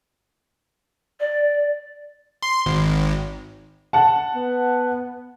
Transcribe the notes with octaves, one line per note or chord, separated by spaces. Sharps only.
D5
C6
G#1
F#5 A5
B3